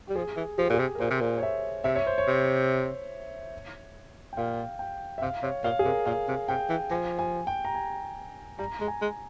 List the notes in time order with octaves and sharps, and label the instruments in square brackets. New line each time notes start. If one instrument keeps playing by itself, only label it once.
[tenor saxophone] G3 [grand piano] G4
[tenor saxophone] F3 [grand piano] G#4
[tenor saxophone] E3
[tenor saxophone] F3 [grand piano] G#4
[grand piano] G4
[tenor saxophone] A#2 [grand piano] G#4
[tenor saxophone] C3
[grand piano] A#4
[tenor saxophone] A#2 [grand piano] C5
[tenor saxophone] C3
A#2
[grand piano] C#5
E5
[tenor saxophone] C3 [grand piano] E5
[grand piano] C#5
C5
C#5
[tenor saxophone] C3
[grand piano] G5
[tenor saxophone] A#2 [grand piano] F5
[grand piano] G5
E5
[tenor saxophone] C3 [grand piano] F5
[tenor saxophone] C3 [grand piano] C#5
[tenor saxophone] A#2 [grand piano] F5
[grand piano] G#4
[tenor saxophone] C3 [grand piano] A#4
[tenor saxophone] A#2 [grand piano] F5
[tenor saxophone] C3
[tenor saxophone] C3 [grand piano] G5
[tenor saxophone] E3
[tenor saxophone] F3 [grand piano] G#5
[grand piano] G#5
G5
A#5
G#5
[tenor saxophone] G3 [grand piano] A#5
[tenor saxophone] G#3 [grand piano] A#5
[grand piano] G#5
[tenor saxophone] G#3